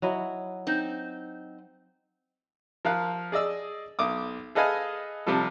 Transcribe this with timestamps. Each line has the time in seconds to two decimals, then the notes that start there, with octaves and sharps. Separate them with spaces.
0.02 F#3 E4 D#5
0.67 C4 D#4
2.85 F3 A#4 F5 F#6
3.32 G#4 D5 D#5 E6
3.99 B1 D6 D#6
4.55 G#4 A4 B4 D#5 F5 G#5
5.26 C3 F3 G3 F4 A4